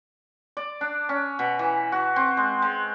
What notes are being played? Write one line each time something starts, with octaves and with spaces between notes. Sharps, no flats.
D5
D4
C#4
B2
E3
F#4
C4
G#3
G#3